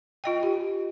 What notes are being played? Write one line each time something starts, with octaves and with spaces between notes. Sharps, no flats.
F4 D#5 G5
G4